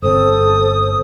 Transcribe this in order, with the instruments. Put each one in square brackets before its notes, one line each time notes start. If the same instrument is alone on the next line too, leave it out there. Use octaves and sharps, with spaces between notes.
[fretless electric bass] G1 C4 [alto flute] A4 [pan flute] C5 [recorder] D#6